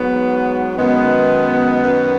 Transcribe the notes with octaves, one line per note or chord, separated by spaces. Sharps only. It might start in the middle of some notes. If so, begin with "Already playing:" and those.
Already playing: G#2 F#3 B3
F#2 D#3 G#3 B3
F#2 D#3 F#3